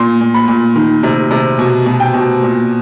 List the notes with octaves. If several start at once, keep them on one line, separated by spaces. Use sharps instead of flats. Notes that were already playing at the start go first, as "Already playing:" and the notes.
Already playing: A#2 C6
A#2
B5
A#2
D#3
C3
C3
B2
B2
G5
B2
A#2